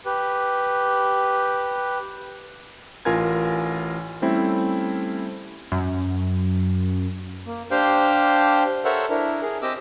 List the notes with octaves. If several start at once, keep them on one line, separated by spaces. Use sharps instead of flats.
G4 B4
A1 F4 A#4 G#5 G#6
G3 A3 C4 C#4 E4
F#2
A#3
D4 G4 C5 F5 G5
A4 A#4 C5 C#5 E5 F#5
D4 E4 A#4
G#4 A#4
C4 G4 D#5 D6 E6